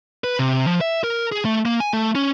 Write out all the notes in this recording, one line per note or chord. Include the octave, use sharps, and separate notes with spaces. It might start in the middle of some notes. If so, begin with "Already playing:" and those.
B4
C3
F3
E5
A#4
G#4
A3
A#3
G#5
A3
C#4